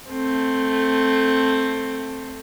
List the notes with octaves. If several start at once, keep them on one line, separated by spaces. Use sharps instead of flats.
A3 C4